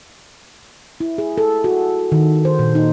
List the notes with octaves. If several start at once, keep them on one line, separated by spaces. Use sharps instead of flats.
E4
G#4
A4
F#4
D#3
C5
A#2
D#4